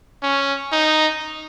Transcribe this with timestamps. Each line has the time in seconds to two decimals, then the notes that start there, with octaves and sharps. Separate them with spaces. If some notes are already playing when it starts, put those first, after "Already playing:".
0.23 C#4
0.72 D#4